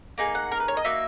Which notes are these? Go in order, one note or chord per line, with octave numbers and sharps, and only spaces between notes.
A#3 D#4 G#4
F#5
A#4
B4
C#5
D#5
A#3 D#4 F#4 E5